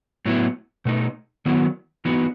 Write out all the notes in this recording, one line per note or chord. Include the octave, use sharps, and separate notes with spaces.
A2 F#3 B3 E4
B2 A3 D#4
D#3 F#3 B3 E4
E3 B3 D#4 F#4